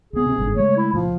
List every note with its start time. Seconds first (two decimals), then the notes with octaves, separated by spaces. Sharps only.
0.13 C#2 B3 G#4
0.26 C3 C4
0.38 G1 G#2 D3
0.56 C#3 G#3 A3 C#5
0.77 E4
0.93 C#2 A#2 F3 F4